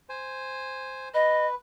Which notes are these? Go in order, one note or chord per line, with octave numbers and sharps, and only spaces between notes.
C5 G#5
B4 D#5